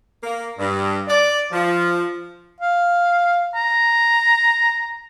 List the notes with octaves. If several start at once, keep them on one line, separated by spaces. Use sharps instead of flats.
A#3
G2
D5
F3
F5
A#5